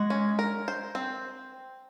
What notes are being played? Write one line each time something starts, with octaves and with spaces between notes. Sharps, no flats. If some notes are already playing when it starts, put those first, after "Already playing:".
Already playing: G#3 F#4
C#4
A#4
C5
C4